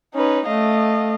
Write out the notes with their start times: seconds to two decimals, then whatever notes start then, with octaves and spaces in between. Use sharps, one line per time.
0.15 C#4 D#4 B4
0.47 A3 D#5 F5